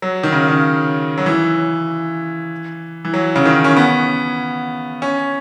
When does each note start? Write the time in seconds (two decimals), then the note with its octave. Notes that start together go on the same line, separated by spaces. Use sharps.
0.02 F#3
0.23 D#3
0.32 C#3
0.48 C#3
1.18 F#3
1.26 E3
3.05 E3
3.14 F#3
3.36 C#3
3.46 D#3
3.64 C#4
3.76 B3
5.02 C#4